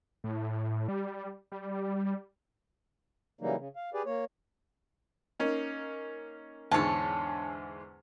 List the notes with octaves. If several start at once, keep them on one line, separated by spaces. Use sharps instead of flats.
A2
G3
G3
C#3 E3 F#3 G3 A#3 D#4
C#3
F5
G4 G#4 B4 D5
A#3 C#5
A#3 C#4 D#4
E2 G#2 D3 C#5 A5